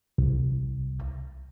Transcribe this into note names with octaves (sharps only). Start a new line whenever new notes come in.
C2